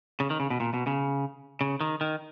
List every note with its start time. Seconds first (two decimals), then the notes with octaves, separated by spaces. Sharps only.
0.20 C#3
0.30 D#3
0.40 C#3
0.50 B2
0.60 A#2
0.74 B2
0.87 C#3
1.61 C#3
1.81 D#3
2.01 D#3